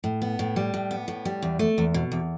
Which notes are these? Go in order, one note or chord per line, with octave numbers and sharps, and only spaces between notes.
A2
B3
A2
G3
A2
B3
A2
G3
E2
A3
E2
B2
E2